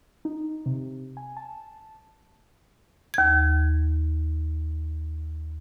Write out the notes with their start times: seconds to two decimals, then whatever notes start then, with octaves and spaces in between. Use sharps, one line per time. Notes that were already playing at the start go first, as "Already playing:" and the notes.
0.25 D#4
0.66 C3
1.17 G#5
1.37 A5
3.14 D#2 G#6